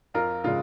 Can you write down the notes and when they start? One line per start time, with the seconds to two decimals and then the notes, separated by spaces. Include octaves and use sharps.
0.14 F2 F4 A#4
0.44 C#3 G#3 F4